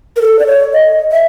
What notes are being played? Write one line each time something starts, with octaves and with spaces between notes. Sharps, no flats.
A#4
A4
D5
C#5
D#5
E5